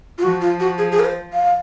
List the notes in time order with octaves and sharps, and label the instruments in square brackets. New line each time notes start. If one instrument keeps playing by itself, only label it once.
[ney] F4
[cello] F3 [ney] F#4
[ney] F4
F#4
G#4
G#4
A#4
C5
F5